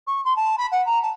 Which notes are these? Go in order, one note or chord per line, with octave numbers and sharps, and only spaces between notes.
C#6
C6
A5
B5
F#5
A#5
A5